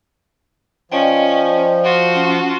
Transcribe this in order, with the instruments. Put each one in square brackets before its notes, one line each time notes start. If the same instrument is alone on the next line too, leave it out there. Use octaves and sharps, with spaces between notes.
[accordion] F3 [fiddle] C#4 [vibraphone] D5 D#5 G5
[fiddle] F4 F#4
[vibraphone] C#4